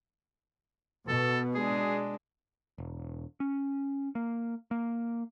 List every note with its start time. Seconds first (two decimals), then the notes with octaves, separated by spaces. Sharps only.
1.08 B2 A4
1.55 G#3 D4 G#4
2.78 E1
3.40 C#4
4.15 A#3
4.71 A#3